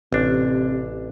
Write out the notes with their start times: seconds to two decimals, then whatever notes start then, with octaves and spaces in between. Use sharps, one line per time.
0.12 A1 C3 D4